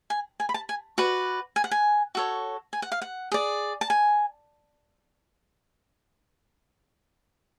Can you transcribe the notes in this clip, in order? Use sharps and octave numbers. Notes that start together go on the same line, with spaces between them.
G#5
G#5
B5
A5
G#5
F#4 B4 D5
G#5
F#5
G#5
F#4 A4 C#5
G#5
F#5
F5
F#5
G#4 D5
A5
G#5